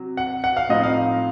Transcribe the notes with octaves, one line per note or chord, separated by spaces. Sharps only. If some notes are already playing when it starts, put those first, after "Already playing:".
Already playing: C3 F#3
F#5
F#5
F5
A2 F3 C4 D#4 D#5
F5